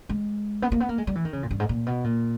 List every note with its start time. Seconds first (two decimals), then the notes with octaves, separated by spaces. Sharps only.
0.09 G#3
0.62 B3
0.72 A#3
0.80 B3
0.89 A#3
0.98 G#3
1.07 G3
1.15 E3
1.25 D#3
1.33 C#3
1.43 A#2
1.51 G2
1.60 G#2
1.69 A#2
1.86 B2
2.04 A#2